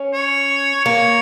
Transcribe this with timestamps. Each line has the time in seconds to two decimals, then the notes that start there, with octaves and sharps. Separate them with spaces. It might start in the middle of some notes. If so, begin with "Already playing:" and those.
Already playing: C#4
0.13 C#5
0.85 A#3 C#5